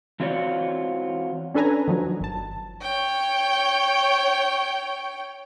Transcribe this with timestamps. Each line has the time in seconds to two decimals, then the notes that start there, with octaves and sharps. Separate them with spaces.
0.20 E3 C4 F4 F#4 C#5 D5
1.54 C#4 D4 A4 B4 G#5 A#5
1.88 D#3 F3 F#3
2.21 G1 A5
2.82 C#5 G5